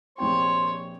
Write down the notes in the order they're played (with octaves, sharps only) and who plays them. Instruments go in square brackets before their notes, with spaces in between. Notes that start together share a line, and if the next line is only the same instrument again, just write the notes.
[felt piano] A#1 C3 G5 [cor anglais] C5 [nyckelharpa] C#5